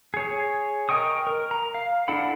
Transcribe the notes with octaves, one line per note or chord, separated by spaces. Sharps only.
G#4 C#5
A#4 D#5 G5 C#6 D#6
A#4
A#5
F5
D4 E4 A4 F#5 B5